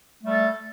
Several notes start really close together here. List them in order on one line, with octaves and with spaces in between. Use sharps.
A3 G3 A4